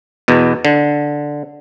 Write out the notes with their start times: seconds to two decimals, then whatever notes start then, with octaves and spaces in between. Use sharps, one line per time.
0.28 E2 B2
0.65 D3